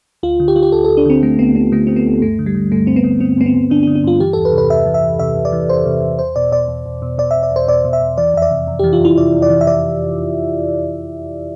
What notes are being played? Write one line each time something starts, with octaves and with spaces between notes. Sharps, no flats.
D2 F4
D3
G4
D3 F4
G4
D2 A4
D2 A4
D4
D3 C4
D3 A3
D2 B3
D2 B3
D3 A3
D3 C4
B3
D2
G2 A3
D3
G3
D3
G2 A3
G2 C4
B3
D3
D3 C4
G2 B3
C4
G2
D3 D4
D4
D3
D4
G2 F4
E3 G4
E2 A4
B4
C3
B4
E2 E5
E3
E5
E2
C3 E5
E2
D5
E3
E2 C5
C3
E2
E2 C5
B2 D5
B2 D5
E2
E2
B2
B2 D5
E2 E5
D5
E2 C5
B2 D5
B2
E5
E2
E3 D5
F2 E5
D5
C3
F2
E3 G4
F4
F2 E4
C3 D5
F2
D5
E3
E5
F2 D5